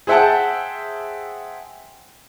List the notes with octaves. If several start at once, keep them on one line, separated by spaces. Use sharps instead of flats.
G#4 C5 E5 F#5 G5 A5